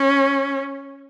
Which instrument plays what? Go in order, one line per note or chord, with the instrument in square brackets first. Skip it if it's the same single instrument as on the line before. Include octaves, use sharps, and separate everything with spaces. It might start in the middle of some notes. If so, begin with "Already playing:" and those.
Already playing: [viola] C#4